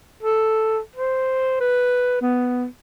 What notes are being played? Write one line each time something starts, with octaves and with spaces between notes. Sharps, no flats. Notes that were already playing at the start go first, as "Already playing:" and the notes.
A4
C5
B4
B3